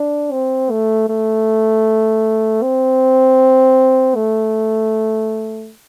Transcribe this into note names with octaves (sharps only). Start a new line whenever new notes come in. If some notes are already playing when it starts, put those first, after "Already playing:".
Already playing: D4
C4
A3
A3
C4
A3